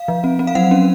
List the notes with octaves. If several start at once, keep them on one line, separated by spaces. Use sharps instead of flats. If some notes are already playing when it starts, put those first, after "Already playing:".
Already playing: F5
F3
C4
C4
F5
F#3 F#5
C#4